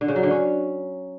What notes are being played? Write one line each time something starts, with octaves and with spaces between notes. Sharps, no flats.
D3
C#3
F#3
D3
C#4